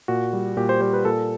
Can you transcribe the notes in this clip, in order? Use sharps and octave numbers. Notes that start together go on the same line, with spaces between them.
A#2 F#4
G3
A#2 G4
C5
G3 C5
B4
A#2 A4